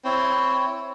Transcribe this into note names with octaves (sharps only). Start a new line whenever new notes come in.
C4 E4 C#5